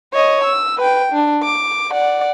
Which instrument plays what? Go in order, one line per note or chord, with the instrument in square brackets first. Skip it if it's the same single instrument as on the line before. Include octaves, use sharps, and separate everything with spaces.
[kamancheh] C#5 D#5
E6
B4 G5
D4
D6
D5 F#5